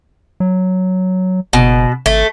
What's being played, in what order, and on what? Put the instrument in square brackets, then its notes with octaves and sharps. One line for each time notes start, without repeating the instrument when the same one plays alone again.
[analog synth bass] F#3
[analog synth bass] F#1 [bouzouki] B2
[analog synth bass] G#1 [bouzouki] A3